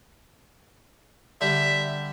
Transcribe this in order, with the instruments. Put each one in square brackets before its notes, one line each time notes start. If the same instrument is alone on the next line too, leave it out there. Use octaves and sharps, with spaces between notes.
[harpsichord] D3 G3 G4 [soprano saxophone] E5